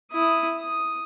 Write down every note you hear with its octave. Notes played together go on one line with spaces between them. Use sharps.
E4 D#6
D#6